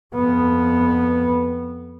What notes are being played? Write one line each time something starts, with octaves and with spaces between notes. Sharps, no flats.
F2 B3